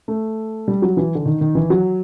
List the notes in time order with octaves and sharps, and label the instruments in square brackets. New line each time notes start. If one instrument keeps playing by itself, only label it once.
[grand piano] A3
G3
F#3
E3
D3
D#3
D#3
E3
F#3